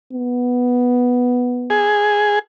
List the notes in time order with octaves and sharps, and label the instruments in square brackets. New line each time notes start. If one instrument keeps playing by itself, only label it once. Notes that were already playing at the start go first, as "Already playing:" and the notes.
[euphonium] B3
[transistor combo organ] G#4